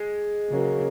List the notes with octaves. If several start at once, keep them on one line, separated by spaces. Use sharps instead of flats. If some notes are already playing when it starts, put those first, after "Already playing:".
Already playing: G#3
C#3 F#3 A#3 C#4